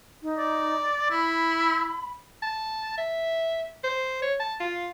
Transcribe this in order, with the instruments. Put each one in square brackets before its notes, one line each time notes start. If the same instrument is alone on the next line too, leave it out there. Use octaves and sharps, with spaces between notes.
[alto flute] D#4
[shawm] D5
[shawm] E4 [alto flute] B5
[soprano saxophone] A5
E5
C5
C#5
A5
F4